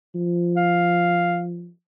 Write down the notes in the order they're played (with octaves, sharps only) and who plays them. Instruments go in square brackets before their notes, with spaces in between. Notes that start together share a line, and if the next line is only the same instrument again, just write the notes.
[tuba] F3
[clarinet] F5